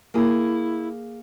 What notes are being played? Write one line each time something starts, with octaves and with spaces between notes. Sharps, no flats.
A#3 E4 G#4